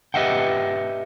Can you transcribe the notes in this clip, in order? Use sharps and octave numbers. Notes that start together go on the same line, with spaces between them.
G4 B4 D#5 E5 F#5 G5